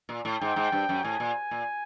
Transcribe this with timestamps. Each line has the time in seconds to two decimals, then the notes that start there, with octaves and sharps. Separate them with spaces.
0.09 A#2
0.25 A2
0.41 G#2 G5
0.56 G#2
0.72 G2
0.89 F#2
1.04 A2 G#5
1.20 A#2
1.51 A#2